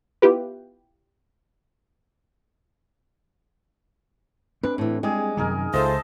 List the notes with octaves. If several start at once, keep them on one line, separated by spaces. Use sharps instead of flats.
B3 E4 F4 G4 B4
C4 D4 B4
A2 E3
G3 G#3 G#4
F#2 C3 D#3 D#4 G#4 A#4
C#2 F4 A4 C5 D#5 E5 A5